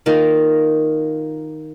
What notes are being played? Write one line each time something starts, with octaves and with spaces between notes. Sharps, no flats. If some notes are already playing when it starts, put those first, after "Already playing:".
D#3 A#3 F4 A#4